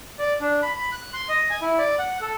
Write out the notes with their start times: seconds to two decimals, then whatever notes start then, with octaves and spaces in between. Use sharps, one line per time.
0.19 D5
0.41 D4
0.63 B5
0.76 B5
0.92 F#6
1.14 C6
1.29 D#5
1.50 G#5
1.62 E4
1.79 D5
1.99 F#5
2.22 A4